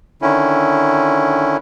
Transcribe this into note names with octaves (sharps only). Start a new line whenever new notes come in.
D3 D#3 C#4 E4